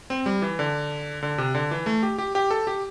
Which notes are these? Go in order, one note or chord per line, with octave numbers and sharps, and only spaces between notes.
C4
G3
E3
D3
D3
C3
D3
E3
A3
G4
G4
G4
A4
G4